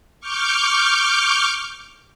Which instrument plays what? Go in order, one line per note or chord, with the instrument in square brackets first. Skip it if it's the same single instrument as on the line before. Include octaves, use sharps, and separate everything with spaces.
[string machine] C#6 D6 F6 G6